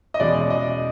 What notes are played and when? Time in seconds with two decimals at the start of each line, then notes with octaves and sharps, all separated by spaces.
0.14 D#5
0.20 E2 B2 G#3 C#4 D5
0.50 D#5